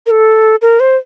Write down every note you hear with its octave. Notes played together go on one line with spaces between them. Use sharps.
A#4
A4
A#4
C5